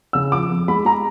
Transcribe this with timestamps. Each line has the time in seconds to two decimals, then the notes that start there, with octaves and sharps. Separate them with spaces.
0.13 C#3 E6
0.32 F3 D6
0.49 F2
0.68 G#3 B5
0.85 G#3 A#5